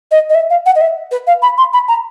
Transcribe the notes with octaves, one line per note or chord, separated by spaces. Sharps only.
D#5
D#5
E5
F5
F#5
D#5
E5
B4
F5
B5
C6
B5
A#5